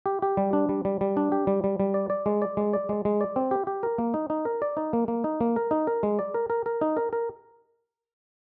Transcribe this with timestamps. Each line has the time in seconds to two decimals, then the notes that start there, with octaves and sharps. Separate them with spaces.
0.06 G4
0.22 G4
0.37 G3
0.53 D4
0.69 G3
0.85 G3
1.01 G3
1.17 D4
1.32 G4
1.47 G3
1.64 G3
1.80 G3
1.94 D5
2.10 D5
2.26 G#3
2.42 D5
2.57 G#3
2.73 D5
2.89 G#3
3.05 G#3
3.21 D5
3.36 C4
3.51 G4
3.67 G4
3.83 A#4
3.98 A#3
4.14 D#4
4.30 D#4
4.45 A#4
4.62 D5
4.77 D#4
4.93 A#3
5.08 A#3
5.24 D#4
5.41 A#3
5.56 A#4
5.71 D#4
5.87 A#4
6.03 G#3
6.19 D5
6.34 A#4
6.50 A#4
6.66 A#4
6.81 D#4
6.97 A#4
7.13 A#4